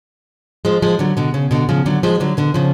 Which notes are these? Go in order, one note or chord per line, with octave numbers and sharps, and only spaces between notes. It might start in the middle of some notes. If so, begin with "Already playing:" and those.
F3 G#3
F3 G#3
D3 F#3
B2 D3
C#3
B2 D3
C#3 F3
D3 F#3
F3 G#3
D3 F#3
B2 D3
C#3 F3